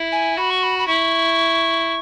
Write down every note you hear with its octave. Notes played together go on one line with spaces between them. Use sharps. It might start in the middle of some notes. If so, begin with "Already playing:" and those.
Already playing: E4
G#5
F#4 B5
C#6
B5
B5
E4 C#6